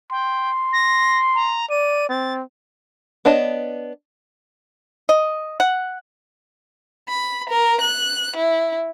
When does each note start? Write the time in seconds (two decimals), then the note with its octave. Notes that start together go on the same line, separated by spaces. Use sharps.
0.11 G5 C6
0.73 A#6
1.35 A#5
1.70 D5 D#7
2.09 C4 A6
3.25 B3 D4 C#5 D#5 A5
5.09 D#5
5.60 F#5
7.09 B5
7.50 A#4
7.81 F#6
8.36 E4